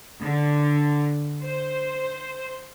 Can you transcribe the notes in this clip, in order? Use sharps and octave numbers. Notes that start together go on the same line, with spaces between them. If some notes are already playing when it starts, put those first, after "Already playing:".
D3
C5